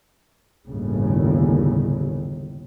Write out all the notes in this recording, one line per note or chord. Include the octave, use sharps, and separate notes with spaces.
G1 D#2 A2 C#3